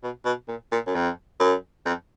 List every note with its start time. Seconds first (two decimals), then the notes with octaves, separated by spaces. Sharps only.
0.04 B2
0.25 B2
0.48 A#2
0.72 A#2
0.86 F#2
0.95 F2
1.40 F#2
1.86 F2